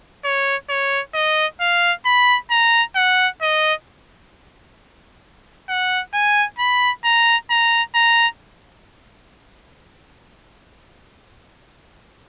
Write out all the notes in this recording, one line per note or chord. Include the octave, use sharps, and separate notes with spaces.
C#5
C#5
D#5
F5
B5
A#5
F#5
D#5
F#5
G#5
B5
A#5
A#5
A#5